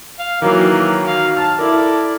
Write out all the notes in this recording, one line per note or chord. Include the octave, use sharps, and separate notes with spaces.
F5
D#3 E3 F#3 A#3
F5
A5 F6
E4 A4 A#4 D5